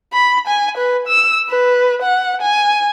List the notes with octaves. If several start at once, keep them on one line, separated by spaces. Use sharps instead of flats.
B5
G#5
B4
E6
B4
F#5
G#5